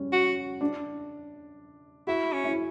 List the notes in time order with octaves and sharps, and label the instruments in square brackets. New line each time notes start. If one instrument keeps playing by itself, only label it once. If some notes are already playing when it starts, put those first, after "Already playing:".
Already playing: [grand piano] G3 C#4
[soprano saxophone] F#4
[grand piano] D4
[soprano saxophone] E4 [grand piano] F#4
[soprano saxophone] C#4
[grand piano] E4